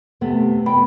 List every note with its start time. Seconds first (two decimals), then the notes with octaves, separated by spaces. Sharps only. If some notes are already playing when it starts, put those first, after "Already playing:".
0.21 C3 A3 B3
0.66 B3 G5 B5